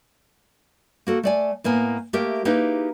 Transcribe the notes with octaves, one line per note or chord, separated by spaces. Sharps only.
A#3 F#4 A4
A3 D5 G#5
A2 A#3 B3 G#5
A3 A#3 G4 A#4 E5
A#3 D#4 E4 G4 G#4 B4